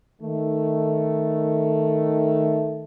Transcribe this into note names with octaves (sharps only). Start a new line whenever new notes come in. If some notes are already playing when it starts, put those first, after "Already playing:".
D#3 A3